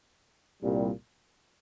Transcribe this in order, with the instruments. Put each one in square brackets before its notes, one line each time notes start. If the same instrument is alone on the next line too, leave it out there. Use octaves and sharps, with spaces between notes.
[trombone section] C2 A#2 G3